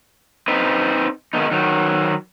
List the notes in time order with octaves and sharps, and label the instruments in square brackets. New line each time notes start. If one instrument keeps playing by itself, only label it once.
[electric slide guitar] C4 D#4 B4
D#3 G#3 B3 D#4
D#3 F#3